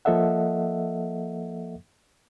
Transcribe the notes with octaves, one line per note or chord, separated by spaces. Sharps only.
F3 A#3 A4 D#5 E5 F#5